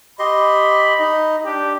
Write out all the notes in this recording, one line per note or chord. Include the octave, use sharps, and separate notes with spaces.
G4 D#5 B5 C6
D#4 D#5
D4 G4